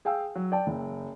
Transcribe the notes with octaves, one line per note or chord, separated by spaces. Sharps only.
G#4 F5 G5 G#5 E6
F#3
D5 G5 A5
F#1